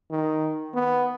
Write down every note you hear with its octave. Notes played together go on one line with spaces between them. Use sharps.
D#3
B3